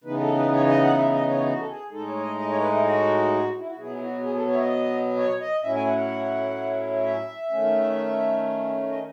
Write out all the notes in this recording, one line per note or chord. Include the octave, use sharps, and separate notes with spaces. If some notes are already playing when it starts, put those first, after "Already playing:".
C#3 E3 B3 D#4 B4
A4
B4
C#5
D#5
F#5
E5
D#5
C#5
F#4
A4
G#4
A2 G#3 D#4 A4
C#5
C#5
D#5
D#5
C#5
B4
E4
F#4
E4
F#4
B2 F#3 B3 E4 G#4
E4
F#4
G#4
A4
C#5
E5
D#5
C#5
D#5
A2 F#3 C#4 E4 E5
G#5
F#5
F#5
E5
D#3 A3 C#4
D#5